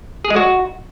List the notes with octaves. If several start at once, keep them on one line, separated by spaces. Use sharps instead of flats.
G#4
G#3
F#4